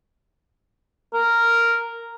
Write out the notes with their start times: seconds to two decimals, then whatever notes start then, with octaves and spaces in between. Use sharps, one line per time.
1.14 A#4